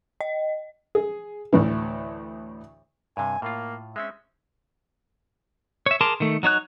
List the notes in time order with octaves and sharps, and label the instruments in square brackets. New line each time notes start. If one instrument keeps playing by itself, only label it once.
[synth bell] D#5
[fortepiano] G#4
D2 A2 E3
[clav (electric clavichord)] G2 C3 [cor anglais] G#5
[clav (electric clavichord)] A2 F4 [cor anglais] A#3
[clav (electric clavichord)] G#3 C4 C#4 [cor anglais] E5
[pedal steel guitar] C#5 E5
G#4 A#4 A5 C6 D6
D#3 A3
F#3 D#4 C#5 F#6